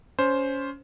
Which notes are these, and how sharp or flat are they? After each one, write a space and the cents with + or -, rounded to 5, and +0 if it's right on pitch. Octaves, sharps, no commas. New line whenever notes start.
C#4 +20 C5 +0